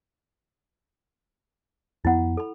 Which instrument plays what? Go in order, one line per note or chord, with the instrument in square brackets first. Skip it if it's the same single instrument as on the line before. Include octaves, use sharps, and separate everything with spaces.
[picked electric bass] F2 B3 [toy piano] E4 F#5
[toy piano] A4 B5